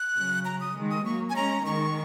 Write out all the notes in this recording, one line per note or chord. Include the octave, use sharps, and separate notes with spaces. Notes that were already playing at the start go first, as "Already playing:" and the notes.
Already playing: F#6
C#3 F#3
A#5
D#6
D#3 G#3
D#6
F#3 A#3 C#6
G#5
G#3 C#4 A#5
D#3 G#3 C#6